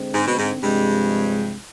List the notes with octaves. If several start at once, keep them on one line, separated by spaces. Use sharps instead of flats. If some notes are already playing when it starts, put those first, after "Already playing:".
Already playing: D3 G#3 C4
G#2
B2
G#2
G2 C3 F3 G#3 C4